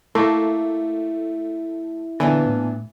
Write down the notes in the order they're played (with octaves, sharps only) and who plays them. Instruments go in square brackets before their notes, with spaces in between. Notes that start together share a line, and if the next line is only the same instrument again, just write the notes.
[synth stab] A3 [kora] A#3 [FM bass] E4
[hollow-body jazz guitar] A#2 B3 D4 [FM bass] D3 [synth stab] E3
[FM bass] A2